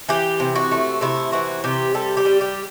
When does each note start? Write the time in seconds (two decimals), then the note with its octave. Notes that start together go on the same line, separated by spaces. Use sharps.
0.09 E3 G4
0.40 C3
0.56 F#4
0.71 A3
1.01 C3 E4
1.32 E3 F#4
1.64 C3 G4
1.94 G3 A4
2.17 G4
2.25 G3
2.41 G4